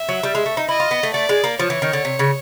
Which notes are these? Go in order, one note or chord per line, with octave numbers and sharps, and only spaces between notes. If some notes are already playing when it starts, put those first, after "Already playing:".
Already playing: E5
F#3
G3
G#3
A3
D#4
E4 D#5
F4
B3
A3
A3 D5
G#3
A#3
F3 C#5
E3
D#3
D3
C3
C#3